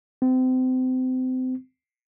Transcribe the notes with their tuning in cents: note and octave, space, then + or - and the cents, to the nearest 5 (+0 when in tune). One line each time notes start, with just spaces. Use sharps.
C4 -30